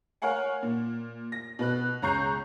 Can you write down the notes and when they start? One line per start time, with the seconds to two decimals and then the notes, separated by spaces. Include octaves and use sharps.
0.22 A#4 C#5 F5 F#5 G#5
0.63 A#2
1.32 A#6
1.59 B2 B4 F#6
2.02 C#2 C#4 A#5 C#6 G6 C7